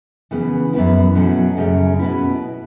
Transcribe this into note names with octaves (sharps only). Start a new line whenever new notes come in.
C#3 E3 B3
F#2 E3 B3 E4
B2 F#3 A3 C#4
F#2 C#3 A3 C#4
B2 B3 E4